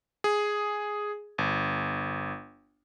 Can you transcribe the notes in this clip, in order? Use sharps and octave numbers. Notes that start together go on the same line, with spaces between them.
G#4
G1